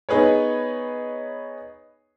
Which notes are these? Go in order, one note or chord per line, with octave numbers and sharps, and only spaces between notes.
B3 D#4 G#4 B4 C#5